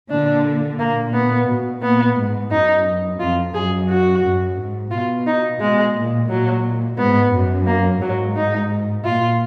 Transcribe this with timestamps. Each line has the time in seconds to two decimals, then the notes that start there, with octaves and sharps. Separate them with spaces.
0.09 A#2 D3 D4
0.78 A#2 A#3
1.13 B3
1.47 B2
1.82 A#2 B3
2.17 G#2
2.51 F#2 D#4
3.20 F2 F4
3.54 F#2 G#4
3.88 F#4
4.22 F#2
4.57 G#2
4.91 B2 F4
5.27 D#4
5.60 B2 G#3
5.95 A#2
6.29 A#2 F#3
6.98 G#2 B3
7.32 F#2
7.67 A#3
8.01 G#2 F#3
8.36 D#4
9.05 A#2 F4